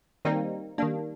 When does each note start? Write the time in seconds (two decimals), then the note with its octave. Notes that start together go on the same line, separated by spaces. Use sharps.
0.25 D#3 G3 A#3 C4 D#4
0.78 D#3 G3 A#3 D4